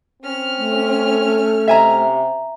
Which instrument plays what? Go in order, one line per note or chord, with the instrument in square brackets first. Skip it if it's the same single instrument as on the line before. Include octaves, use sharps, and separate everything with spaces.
[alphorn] C4 [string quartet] C#4 F6
[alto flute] A3
[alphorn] C3 [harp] E5 G#5 A#5